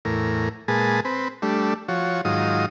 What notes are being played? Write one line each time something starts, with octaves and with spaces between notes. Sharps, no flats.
E2 A2 A#4
A#2 G#3 G#4 B4 A5
C4 B4
G3 A3 D4
F3 F#4 C#5
G#2 D#3 F#3 F4 D#6